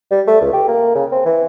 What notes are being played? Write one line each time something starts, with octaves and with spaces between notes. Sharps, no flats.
G3
A3
C#2
G4
A#3
C#3
C4
E3